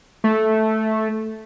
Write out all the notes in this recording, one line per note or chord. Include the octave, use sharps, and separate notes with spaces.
A3